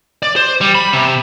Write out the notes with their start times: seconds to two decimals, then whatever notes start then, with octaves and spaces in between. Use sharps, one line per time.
0.23 D5
0.36 C5
0.61 G3
0.75 B5
0.93 C3